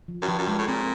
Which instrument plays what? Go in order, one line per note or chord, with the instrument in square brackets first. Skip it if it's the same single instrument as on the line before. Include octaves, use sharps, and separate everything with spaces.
[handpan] F3
[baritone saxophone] F#2
[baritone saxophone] G2 [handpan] F3
[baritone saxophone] F#2
[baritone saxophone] G2 [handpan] G#3
[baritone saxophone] A2
[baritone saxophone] A#2 [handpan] C4